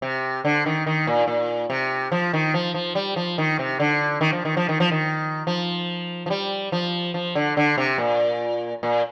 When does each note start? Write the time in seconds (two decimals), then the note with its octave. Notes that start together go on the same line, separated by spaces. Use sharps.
0.02 C3
0.45 D3
0.66 D#3
0.86 D#3
1.07 A#2
1.27 A#2
1.70 C3
2.12 F3
2.33 D#3
2.54 F3
2.74 F3
2.95 G3
3.16 F3
3.38 D#3
3.59 C3
3.80 D3
4.21 D#3
4.33 F3
4.45 D#3
4.57 F3
4.69 D#3
4.80 F3
4.92 D#3
5.47 F3
6.26 F3
6.30 G3
6.72 F3
7.14 F3
7.35 D3
7.57 D3
7.78 C3
7.98 A#2
8.83 A#2